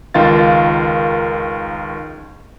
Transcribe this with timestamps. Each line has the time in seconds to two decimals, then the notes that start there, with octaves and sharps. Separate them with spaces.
0.14 C#2 D#3 F4 F5 A6